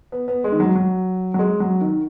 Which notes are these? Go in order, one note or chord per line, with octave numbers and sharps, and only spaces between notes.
B3
B3
G#3
D#3
F#3
F#3
F#3
G#3
F#3
D#3